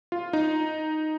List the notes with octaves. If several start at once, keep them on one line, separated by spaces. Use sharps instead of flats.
F4
D#4